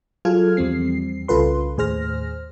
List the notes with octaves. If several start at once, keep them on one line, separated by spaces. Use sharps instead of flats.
F#3 F4 G#4 A4 F6 G#6
E2 F3 G3 C4 C7
C2 C#3 F4 A4 B4 C6
D#2 A2 G#4 C5 F6 A#6